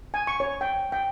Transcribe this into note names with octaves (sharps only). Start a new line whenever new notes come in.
G#5
C#6
C#5
G5
G5